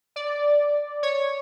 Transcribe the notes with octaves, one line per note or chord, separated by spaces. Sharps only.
D5
C#5